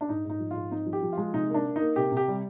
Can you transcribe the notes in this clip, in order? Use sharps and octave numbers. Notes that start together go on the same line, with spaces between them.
D4
G#2 D#4
G#2 D#4
F3
G#2 F4
C4 D#4
F3
G4
F3
F4
G#3
C3 D#4
A#3 D4
A#3
A#3 D#4
C3 G4
C3
G4
G3